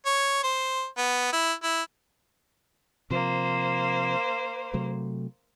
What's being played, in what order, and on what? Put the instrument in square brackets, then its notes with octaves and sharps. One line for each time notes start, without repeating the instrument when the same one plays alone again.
[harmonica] C#5
C5
B3
E4
E4
[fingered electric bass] C3 F3 [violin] A#3 C5
[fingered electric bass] C3 F#3 A3